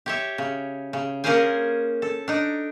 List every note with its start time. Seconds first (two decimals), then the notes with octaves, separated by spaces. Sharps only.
0.06 G4 C#5 E5
0.38 C#3
0.93 C#3
1.24 A#3 C#4 G#4 A#4 C5 G#5
2.02 A4
2.28 D4 D#4